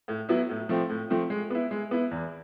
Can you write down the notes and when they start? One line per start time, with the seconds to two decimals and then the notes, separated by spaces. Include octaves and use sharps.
0.08 A2
0.29 F#3 B3 E4
0.49 A2
0.69 F3 A3 C4
0.90 A2
1.10 F3 A3 C4
1.30 G#3
1.50 B3 E4
1.71 G#3
1.91 B3 E4
2.11 E2